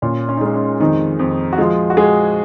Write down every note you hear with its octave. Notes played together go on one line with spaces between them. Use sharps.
A#2 C#4
C#4
D#4
G#3 C#4
C#4
F2 D#3 D#4
F2
F#4
F3 G#3 F4
F#4
G#3 G#4